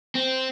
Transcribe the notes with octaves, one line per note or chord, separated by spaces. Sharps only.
C4